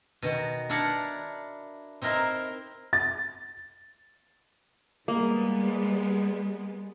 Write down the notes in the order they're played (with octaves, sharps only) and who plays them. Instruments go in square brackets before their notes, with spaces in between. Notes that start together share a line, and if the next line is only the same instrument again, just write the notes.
[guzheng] B2 D#3 F#4
D4 E4 A#4 F#5 A5
C4 D#4 E4 A#4 C5 E5
[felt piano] A6
[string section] G3 G#3 B3 [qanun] A#3